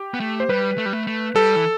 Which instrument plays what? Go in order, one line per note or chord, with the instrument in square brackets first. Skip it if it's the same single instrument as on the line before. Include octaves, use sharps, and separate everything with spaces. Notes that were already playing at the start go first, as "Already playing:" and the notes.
Already playing: [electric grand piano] G4
[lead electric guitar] B3
A3
[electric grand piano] C5
[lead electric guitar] G3 [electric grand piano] B4
[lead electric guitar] A3
G3
A3
A3
[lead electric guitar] G3 [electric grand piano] A4
[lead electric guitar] E3